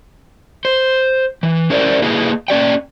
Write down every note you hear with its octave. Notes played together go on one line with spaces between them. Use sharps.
C5
E3
C#4 E4 A#4 C5 D5
A#3 E4 G#4 B4 D#5
A#3 C#4 D5 G5